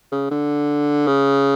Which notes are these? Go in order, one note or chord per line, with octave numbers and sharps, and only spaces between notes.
C#3
D3
C#3